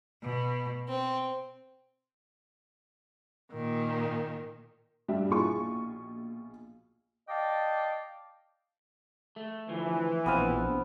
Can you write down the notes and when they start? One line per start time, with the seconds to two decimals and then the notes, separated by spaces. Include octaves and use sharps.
0.23 B2
0.89 C4
3.51 A#2 D#3
5.08 G2 G3 D4 G4 E5
5.29 A#1 B2 E4 F4 G#4 C#6
7.29 D5 D#5 F5 G5 A5 D6
9.36 A3
9.69 D2 E3 F3
10.26 A#1 B2 B3 C4 F5